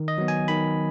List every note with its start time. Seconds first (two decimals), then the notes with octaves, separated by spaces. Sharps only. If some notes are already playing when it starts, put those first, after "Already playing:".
Already playing: D#3
0.08 D#5
0.18 F#3 B3
0.28 G#5
0.48 D#3 B5